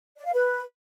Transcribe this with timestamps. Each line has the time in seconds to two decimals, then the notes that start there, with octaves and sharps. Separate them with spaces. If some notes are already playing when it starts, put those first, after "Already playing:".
0.18 D5
0.26 F5
0.33 B4